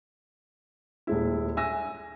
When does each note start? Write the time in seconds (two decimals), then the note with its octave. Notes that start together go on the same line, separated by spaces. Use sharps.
1.07 D#1 G#3 E4
1.57 E5 G#5 E6 A#6